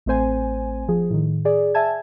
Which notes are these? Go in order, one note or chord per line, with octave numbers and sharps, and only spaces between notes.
A1 A3 C4 C5 G#5
F3 G#4
A2 D#3
G#4 D5
E5 G#5 A5 G#6